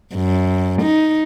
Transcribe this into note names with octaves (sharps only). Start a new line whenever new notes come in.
F#2
D#4